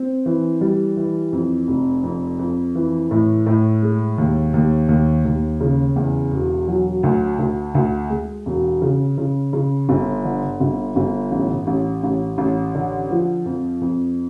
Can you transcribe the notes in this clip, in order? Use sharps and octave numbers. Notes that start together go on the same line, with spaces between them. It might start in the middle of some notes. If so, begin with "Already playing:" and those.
Already playing: C4
E3
G3
E3
F2
F1
F2
F2
E3
A2
A2
G#3
D#2
D#2
D#2
D#2
C#3
E2
E1
F#3
D2
D2
D2
G#3
E1
C#3
C#3
C#3
G1
D3
G1
G1
A1
A1
A1
A1
D3
F3
F2
F2